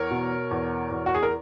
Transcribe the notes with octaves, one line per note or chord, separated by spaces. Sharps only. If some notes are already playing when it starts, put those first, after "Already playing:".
Already playing: E2 A#4 C#5
B2
E2
E2
F#4
G#4
A#4